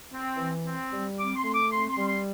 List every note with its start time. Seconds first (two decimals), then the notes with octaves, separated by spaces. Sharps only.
0.11 C4
0.37 E3
0.64 C4
0.91 G3
1.18 C4 D6
1.36 C6
1.45 A3
1.53 D6
1.71 C4 C6
1.90 C6
1.98 G3
2.07 C6